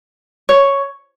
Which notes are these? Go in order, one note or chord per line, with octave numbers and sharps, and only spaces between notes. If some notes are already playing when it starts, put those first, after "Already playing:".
C#5